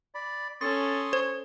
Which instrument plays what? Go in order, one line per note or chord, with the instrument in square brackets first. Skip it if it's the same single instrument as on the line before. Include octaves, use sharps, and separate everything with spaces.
[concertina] D5 B5
[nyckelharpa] C#4 A4 [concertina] C6 C#6 D#6 [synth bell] A6
[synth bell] C5